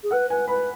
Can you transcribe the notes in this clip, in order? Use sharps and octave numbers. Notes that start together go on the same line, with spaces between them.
G#4
B4 F#5
B4 G#5
B4 B5